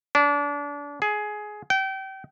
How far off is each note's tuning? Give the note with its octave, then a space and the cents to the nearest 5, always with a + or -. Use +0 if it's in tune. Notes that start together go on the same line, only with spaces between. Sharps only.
D4 -30
G#4 +15
G5 -30